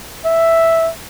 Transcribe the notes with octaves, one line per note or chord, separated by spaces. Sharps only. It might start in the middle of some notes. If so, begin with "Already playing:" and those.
E5